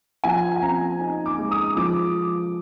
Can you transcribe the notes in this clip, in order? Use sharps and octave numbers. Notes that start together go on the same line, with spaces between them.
F3 G#5
G#5
C4 A#5
D#4
D6
G#3
D#6
F3 D6